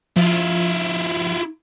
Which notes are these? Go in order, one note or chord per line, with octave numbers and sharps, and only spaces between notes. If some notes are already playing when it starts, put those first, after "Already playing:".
F3 E4 F4